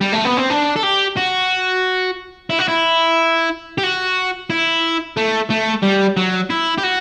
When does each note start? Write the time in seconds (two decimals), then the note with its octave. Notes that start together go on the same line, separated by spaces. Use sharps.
0.01 G3
0.13 A3
0.25 B3
0.37 C4
0.50 D4
0.76 A4
0.83 G4
1.17 F#4
2.50 E4
2.59 F#4
2.68 E4
3.78 G4
3.83 F#4
4.50 E4
5.17 A3
5.50 A3
5.83 G3
6.17 F#3
6.50 E4
6.78 G4
6.83 F#4